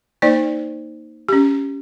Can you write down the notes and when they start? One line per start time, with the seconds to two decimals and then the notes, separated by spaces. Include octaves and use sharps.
0.22 A#3 D#4 C5 D5
1.29 C#4 G4